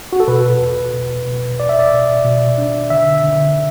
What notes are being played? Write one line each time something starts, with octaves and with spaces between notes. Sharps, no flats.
F#4
A4
B2 B4
E2
B2
B2
B2 D5
E5
D5
B2
B2
D4
D3 E5
D3